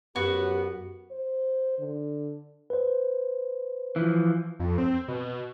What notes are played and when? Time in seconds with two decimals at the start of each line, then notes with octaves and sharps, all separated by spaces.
0.16 F#2 B3 F#4 G4
1.11 C5
1.79 D3
2.70 B4 C5
3.96 E3 F3
4.59 F2
4.78 C4
5.08 B2